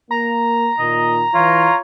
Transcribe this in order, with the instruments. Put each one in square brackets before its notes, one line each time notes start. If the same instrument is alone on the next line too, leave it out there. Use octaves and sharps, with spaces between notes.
[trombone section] A#3 [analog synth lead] A#5
[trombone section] A#2 D#3 [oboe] D#5
[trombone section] E3 [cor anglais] F4 [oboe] C#5